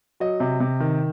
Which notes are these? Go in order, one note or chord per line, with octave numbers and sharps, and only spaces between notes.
F#3 D#5
C3
C3
D#3